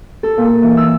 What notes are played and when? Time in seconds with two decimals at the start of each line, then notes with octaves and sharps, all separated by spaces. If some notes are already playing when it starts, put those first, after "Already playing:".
0.23 A4
0.38 A#2
0.62 E3
0.77 E6